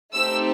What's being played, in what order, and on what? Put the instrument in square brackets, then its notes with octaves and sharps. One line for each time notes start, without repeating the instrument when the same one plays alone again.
[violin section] A3 C4 D#4 G4 E6